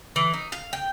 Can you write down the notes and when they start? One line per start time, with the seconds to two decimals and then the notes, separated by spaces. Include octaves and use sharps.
0.16 E3
0.34 D#4
0.52 F5
0.73 G5